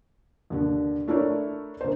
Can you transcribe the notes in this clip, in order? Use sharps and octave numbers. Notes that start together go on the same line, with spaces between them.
D#2 D3
A3 D4 E4 A4 A#4 C#5
D3 A#3 C5